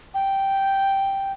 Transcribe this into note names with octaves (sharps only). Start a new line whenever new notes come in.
G5